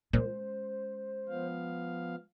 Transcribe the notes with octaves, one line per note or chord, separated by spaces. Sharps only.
A#2 G#3 C#4 C5
F3 B3 F5